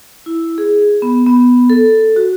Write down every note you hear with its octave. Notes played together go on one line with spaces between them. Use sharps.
E4
G#4
B3
B3
A4
F#4